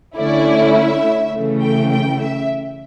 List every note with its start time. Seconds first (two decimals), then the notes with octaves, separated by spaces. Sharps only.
0.17 D3 A3 C#4 E4 D5
0.76 E5
1.33 C#3 E3 A3
1.61 G5
1.91 G5
2.20 E5